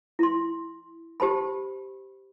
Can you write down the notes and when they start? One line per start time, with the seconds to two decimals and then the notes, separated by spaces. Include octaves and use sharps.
0.19 E4 C6
1.20 G4 C5 A5 B5